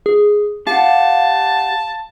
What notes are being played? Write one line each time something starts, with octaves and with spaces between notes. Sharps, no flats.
G#4
G4 F5 F#5 A5